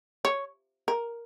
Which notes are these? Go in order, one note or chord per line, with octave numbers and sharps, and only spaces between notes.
C#5
A#4